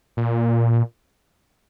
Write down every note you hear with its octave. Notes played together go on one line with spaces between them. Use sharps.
A#2